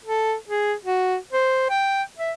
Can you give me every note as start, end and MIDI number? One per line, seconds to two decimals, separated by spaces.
0.06 0.34 69
0.49 0.73 68
0.85 1.16 66
1.33 1.68 72
1.70 2.03 79
2.18 2.32 76